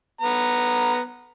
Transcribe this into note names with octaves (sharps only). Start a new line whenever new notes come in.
B3 A#5